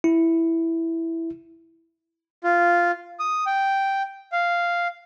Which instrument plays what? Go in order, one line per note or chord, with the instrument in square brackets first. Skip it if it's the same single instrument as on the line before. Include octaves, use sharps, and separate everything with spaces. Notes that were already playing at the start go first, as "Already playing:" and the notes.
[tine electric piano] E4
[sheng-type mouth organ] F4
D#6
G5
F5